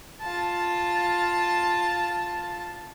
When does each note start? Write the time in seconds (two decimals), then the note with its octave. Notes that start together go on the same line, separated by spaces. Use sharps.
0.21 F4 A5